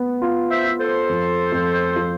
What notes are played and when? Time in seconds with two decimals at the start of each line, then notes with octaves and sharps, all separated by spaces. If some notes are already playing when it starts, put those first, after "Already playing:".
Already playing: B3
0.22 F4
0.50 C5 E5
0.65 F4
0.80 A4 C5
1.09 F2
1.52 F2
1.96 F3